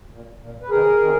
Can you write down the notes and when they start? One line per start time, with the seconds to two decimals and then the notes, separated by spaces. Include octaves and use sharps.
0.11 A#2
0.40 A#2
0.61 B4
0.69 C3 D#3 G#4 A#4
0.99 C3 D#3